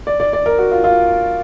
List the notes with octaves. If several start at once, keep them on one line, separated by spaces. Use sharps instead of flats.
D5
D5
D5
A#4
F#4
F4
F4